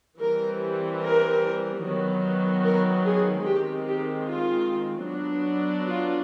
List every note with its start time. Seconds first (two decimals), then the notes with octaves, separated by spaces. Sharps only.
0.20 E3 G3 C4 A#4
1.02 A#4
1.83 D#3 F#3 B3
2.64 A#4
3.05 G#4
3.45 D#3 G#3 C4 G4
3.86 G4
4.27 F4
5.07 F#3 B3 D4
5.89 F4